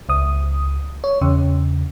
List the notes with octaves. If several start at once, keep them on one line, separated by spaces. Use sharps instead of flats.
C#2 D#6
C#5
E2 C#3